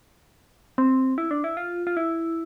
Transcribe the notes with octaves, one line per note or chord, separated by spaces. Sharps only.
C4
E4
D4
E4
F4
F4
E4